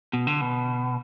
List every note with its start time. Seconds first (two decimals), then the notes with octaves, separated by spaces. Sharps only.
0.13 B2
0.27 D3
0.41 B2